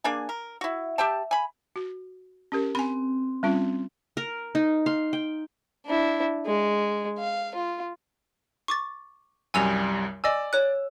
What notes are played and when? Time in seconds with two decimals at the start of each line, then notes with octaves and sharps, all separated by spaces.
0.04 A#3 D4 G#4 G#5
0.29 A#4
0.61 E4 F#4
0.98 G4 E5 G5 A5
1.31 G#5 B5
1.76 F#4
2.52 C#4 G4 A#4
2.75 C4 G#5 B5
3.43 G3 C#4 F4
4.17 A#4
4.55 D#4
4.86 F5 C6
5.13 G5
5.85 D4 E4
6.46 G#3
7.18 F5
7.55 F4
8.68 C#6 D6 A6
9.54 C2 F#2 G3 G#5 E6 F7
10.24 D5 D#5 G#5 E6
10.53 C#5 F#6